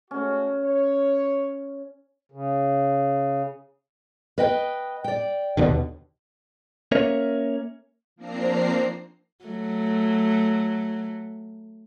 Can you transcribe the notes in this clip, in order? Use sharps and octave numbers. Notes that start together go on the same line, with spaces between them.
G#3 A3 C#4 F#4
C#5
C#3
B4 D#5 G5
D5 G5
D#2 B2 D3
A#3 C#4 A#4 C#5 E5
F3 A#3 C4 D4 A#5 C7
F#3 A3